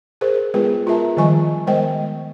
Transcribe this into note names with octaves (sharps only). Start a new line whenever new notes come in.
G#4 A#4 C5
G#3 B3 F4 G#4 B4 G5
F4 G#4 A#4 E5 A5 A#5
D#3 F3 G3 D#5 G#5 C#6
G#3 B3 A#4 C5 D#5 G5